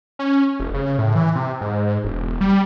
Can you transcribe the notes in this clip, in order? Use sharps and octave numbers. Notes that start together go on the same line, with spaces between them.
C#4
F1
C#3
A2
E3
C3
G#2
E1
G3